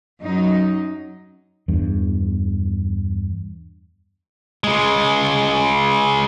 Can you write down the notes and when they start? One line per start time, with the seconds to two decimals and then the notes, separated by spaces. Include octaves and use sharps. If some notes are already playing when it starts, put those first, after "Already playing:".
0.21 F#2 F#3 D#4
1.68 E2 G2
4.64 C#3 G#3